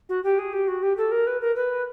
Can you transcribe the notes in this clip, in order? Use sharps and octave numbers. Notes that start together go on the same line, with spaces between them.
F#4
G4
G#4
G4
F#4
G4
A4
A#4
B4
A#4
B4